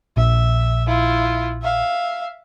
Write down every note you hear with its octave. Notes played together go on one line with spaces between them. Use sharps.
A#1 E5
E4 F4
E5 F5